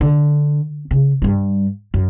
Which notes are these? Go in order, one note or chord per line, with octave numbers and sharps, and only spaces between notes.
D3
C#3
G2 G3
F#2